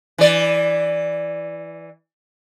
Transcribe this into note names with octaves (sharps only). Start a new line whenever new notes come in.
E3 D5